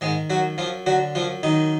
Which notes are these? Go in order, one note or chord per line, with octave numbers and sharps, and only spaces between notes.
G#2 D#3 G#3
F#2 F#3 F#4
F#2 F3 F4
D3 F#3 F#4
F#2 F3 F4
F#2 D#3 D#4